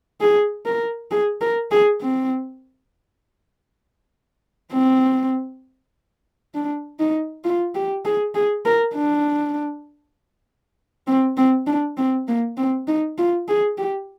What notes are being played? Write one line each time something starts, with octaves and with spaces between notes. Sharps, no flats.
G#4
A#4
G#4
A#4
G#4
C4
C4
D4
D#4
F4
G4
G#4
G#4
A#4
D4
C4
C4
D4
C4
A#3
C4
D#4
F4
G#4
G4